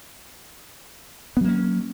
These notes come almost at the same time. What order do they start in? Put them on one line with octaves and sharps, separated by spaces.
B3 F#3 A#3 C#4